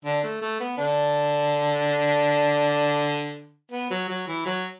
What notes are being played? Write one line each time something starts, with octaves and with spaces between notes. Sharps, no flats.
D3 D4
A3
A3
B3
D3 D4
B3
F#3
F#3
E3
F#3